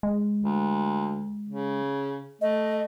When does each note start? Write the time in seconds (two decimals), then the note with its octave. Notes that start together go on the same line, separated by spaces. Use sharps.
0.03 G#3
0.43 D2
1.49 C#3
2.41 A3 D#5